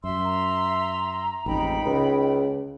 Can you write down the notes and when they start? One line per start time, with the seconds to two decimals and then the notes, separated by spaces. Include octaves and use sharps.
0.04 F#2 E5 C6 E6
0.24 A#5
1.46 A1 F2 G#2 D#4 G5 B5
1.86 C#2 C#3